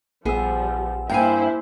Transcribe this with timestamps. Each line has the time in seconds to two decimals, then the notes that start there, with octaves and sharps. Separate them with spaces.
0.25 A#1 F3 G3 B3 G#4 E6
1.09 G2 A#3 E4 C5 F5 G5 G#5